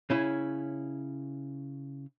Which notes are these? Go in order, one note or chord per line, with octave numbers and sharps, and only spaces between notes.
C#3 C#4 E4